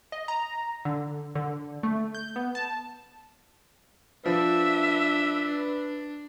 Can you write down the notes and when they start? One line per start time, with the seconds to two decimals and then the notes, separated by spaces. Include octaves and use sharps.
0.12 D#5
0.28 A#5
0.85 D3
1.35 D3
1.83 A3
2.14 G6
2.36 B3
2.55 A5
4.26 F3 D4 B4 E5